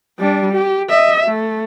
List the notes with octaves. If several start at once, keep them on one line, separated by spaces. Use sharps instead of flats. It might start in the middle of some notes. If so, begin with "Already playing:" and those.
G3 D4
G4
D#5 E5
A3